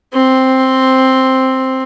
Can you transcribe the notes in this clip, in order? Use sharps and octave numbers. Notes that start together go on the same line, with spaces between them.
C4